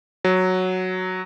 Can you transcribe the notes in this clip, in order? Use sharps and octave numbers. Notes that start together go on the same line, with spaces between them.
F#3